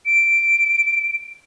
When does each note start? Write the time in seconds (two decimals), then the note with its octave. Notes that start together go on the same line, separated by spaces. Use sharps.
0.06 D7